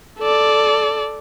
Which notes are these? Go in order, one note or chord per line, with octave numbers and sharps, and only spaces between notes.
A4 D5